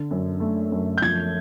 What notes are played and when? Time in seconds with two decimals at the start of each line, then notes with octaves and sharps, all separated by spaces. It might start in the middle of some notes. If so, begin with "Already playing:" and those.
Already playing: D3
0.11 F#2
0.40 A3
0.72 F#2
0.98 G6
1.02 F3 G#6